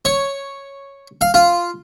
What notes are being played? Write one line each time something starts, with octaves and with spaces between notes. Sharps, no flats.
C#5
F5
F4